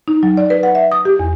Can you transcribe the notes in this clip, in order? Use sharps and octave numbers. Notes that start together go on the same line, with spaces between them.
D#4
F#3
D5
B4
F#5
E5
D#6
G4
E2